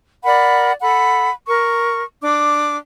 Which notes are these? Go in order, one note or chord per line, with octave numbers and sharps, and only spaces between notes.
A#4 D5 F#5 B5
A4 F#5 B5
A#4 C#6
D4 D6